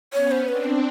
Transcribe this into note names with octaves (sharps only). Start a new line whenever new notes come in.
B3 C#4 C#5
C5
C4 D4 B4